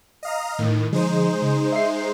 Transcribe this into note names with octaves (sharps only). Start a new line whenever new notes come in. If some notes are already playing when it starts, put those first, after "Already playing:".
D#5 F5 A#5
A2 D#3
D3 F3 G#3 D#4 C5
C#3
E5 C7